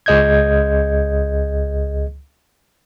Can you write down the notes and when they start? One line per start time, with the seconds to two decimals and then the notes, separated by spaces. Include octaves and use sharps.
0.06 C#2 G#4 D#5 G6 G#6